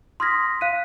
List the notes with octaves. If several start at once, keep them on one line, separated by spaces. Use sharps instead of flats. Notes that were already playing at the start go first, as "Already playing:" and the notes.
C6 D#6 F6 G#6 A#6 B6
F5 F#6 B6 D#7